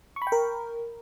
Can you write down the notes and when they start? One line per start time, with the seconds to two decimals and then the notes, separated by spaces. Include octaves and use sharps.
0.16 C#6
0.22 B5
0.27 G5
0.32 A#4